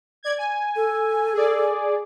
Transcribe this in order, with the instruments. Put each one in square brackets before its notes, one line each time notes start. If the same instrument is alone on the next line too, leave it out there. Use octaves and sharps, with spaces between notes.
[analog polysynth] D5 G#6
G#5
[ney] A4
[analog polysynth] G#4 D5